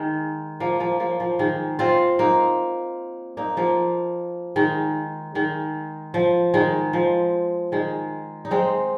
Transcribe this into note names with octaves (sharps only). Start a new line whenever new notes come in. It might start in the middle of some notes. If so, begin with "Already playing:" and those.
Already playing: D#3 G#3
F3 A#3
F3 A#3
F3 A#3
F3
D#3 G#3
C4 F4
A#3 D#4
A#3 D#4
F3 A#3
D#3 G#3
D#3 G#3
F3
D#3 G#3
F3
D#3 G#3
D#4
G#3 C4